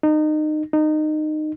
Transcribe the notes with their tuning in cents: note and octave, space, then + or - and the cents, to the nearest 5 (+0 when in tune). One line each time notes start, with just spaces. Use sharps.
D#4 -25
D#4 -20